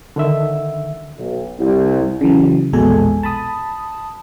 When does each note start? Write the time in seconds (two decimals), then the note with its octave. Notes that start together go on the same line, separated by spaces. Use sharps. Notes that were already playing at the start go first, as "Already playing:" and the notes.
0.16 D3 D#3 E5
1.18 B1
1.59 C2
2.21 C#3 E3 F#3
2.73 A#1 E2 B2 G#3 A4 G#5
3.23 A5 B5 D#6